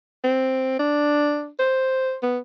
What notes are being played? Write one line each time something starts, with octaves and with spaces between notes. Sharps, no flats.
C4
D4
C5
B3